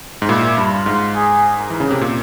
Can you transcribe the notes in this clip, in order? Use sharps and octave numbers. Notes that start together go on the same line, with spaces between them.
G#2
A#2 E4
G2
F4
G#2
G#4
A#4
E3
C#3
C3
A#2